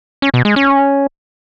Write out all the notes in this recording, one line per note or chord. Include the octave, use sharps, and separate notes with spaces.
C#4
B2
G#3
C#4